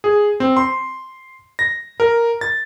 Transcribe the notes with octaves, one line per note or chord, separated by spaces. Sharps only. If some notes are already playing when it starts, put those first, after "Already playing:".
G#4
C4
C6
A#6
A#4
A6